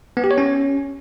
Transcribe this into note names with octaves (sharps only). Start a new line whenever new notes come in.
B3
G4
C#5
C#4